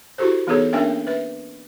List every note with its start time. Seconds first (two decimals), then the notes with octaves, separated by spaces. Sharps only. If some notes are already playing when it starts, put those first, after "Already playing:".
0.18 E4 F#4 G4 A4 C5
0.47 E3 B3 D#4 G#4 A4 C#5
0.73 A#3 C#4 D4 A#4 E5 G5
1.07 B4 E5